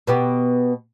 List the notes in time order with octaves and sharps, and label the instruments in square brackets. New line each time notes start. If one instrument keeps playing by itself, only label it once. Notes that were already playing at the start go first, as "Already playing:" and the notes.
[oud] B2 B3 G4